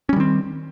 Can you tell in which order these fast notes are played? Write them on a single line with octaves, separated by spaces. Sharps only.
C#4 G3 D#3 C4